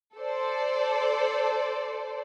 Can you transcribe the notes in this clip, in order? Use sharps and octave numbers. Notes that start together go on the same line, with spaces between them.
A4 C5 D5